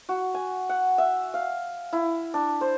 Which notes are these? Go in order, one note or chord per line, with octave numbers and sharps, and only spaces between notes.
F#4
G#5
F#5
E5
F5
E4
D4
C5